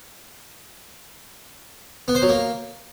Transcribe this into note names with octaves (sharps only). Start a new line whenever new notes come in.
B3
C5
F#3
A#3